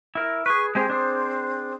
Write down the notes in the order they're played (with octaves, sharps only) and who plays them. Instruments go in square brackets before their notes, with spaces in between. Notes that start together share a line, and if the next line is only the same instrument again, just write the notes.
[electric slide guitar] E4 A#4
[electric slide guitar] G#4 B4 [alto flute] C#6
[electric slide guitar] G#3 G4 G#4 [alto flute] C4
[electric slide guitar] D4 G#4 C5